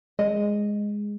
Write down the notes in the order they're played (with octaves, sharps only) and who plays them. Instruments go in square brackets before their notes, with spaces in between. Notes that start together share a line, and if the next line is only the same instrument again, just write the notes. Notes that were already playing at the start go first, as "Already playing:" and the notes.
[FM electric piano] G#3 [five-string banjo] D#5